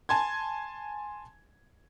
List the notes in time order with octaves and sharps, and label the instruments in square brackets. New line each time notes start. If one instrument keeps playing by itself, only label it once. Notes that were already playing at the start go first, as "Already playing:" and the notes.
[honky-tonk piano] G#5 A5 C6 G#6